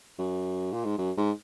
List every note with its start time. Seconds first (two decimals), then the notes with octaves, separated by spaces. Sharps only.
0.19 F#2
0.72 A#2
0.85 G#2
0.98 F#2
1.17 G#2